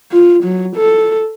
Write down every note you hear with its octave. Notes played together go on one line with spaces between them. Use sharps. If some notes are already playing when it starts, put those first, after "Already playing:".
F4
F#3
A4